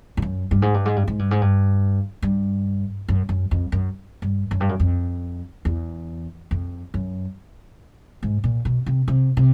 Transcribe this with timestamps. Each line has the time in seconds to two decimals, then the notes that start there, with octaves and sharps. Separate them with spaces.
0.17 G2
0.22 F#2
0.51 G2
0.62 G#2
0.74 G2
0.85 G#2
0.96 G2
1.07 G#2
1.19 G2
1.31 G#2
1.41 G2
2.22 G2
3.08 F#2
3.29 F#2
3.51 F2
3.72 F#2
4.22 G2
4.51 F#2
4.60 G2
4.69 F#2
4.80 F2
5.65 E2
6.51 F2
6.94 F#2
8.23 G#2
8.44 A#2
8.65 B2
8.86 C3
9.08 C3
9.37 C3